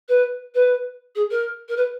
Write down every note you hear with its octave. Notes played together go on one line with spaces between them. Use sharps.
B4
B4
G#4
A#4
A#4
B4